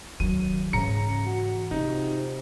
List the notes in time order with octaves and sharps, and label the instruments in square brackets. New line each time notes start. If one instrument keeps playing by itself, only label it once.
[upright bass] D#3 F#3 [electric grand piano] D#7
[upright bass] G#2 E3 [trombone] C#3 [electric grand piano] A#5 C#7
[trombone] F#4
[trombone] C3 [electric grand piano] D#4 [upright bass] F4